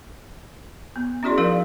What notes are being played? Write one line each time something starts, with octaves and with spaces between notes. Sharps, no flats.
B3
C#4 E4 F#4 G#4 D5 C6
F3 D#4 A#4 D5 F5